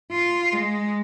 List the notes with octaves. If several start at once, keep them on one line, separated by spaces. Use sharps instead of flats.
F4
G#3